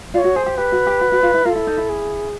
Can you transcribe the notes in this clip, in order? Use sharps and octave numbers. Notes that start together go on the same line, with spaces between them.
F4 C#5 D5
F#4
G#4 C5
G4
G4 B4
F#4
G4
F#4
F#4
F4
E4
F4 A4 A#4
E4
D#4
E4
G#4